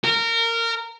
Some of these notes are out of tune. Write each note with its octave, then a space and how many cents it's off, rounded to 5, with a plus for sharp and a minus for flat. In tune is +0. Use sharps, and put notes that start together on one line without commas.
A#4 -20